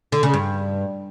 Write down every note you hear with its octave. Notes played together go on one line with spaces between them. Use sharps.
D3
C#3
G2